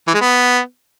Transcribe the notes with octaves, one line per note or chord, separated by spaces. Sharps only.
E3
G#3
B3